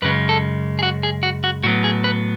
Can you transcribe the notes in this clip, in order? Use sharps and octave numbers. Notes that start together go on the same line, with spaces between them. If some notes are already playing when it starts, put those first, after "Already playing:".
F#2 C#3 G#3 B4
A4
G#4
F#4
G#4
F#4
F#4
A2 F#3 B3 F#4
G#4
B4